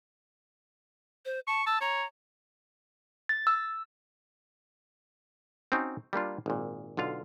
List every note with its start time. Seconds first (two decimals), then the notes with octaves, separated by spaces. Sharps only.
1.25 C5
1.47 A5 C#6
1.66 A5 E6
1.81 C#5 A#5
3.29 A6
3.47 E6
5.72 C4 C#4 D#4 F#4
6.13 G3 A#3 D4 F4
6.46 G#1 A#2
6.97 B1 D3 F4 F5